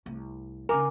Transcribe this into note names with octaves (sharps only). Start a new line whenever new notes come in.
C2 A3
C#3 D4 A#4 G#5 D6